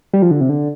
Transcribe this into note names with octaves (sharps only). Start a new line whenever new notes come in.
G3
F3
D3
C3
D3